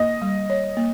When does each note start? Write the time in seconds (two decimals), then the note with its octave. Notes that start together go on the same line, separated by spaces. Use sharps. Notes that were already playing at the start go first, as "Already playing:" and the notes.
Already playing: A#3 D#5
0.22 G3
0.50 C#5
0.77 A#3